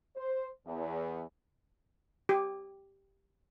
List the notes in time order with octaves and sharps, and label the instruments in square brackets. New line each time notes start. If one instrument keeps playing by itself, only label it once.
[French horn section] C5
E2
[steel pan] G4